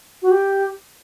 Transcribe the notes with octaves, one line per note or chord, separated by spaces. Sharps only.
F#4
G4